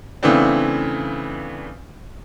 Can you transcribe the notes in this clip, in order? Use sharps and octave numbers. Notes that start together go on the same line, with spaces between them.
C#3 E3 A3 B3 C4 D4